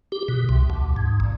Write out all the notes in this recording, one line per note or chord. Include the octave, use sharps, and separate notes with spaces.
G4
B2
C2
D2
G#2
A#1